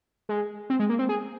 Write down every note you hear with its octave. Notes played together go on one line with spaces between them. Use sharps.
G#3
C4
G#3
A#3
C4
G#4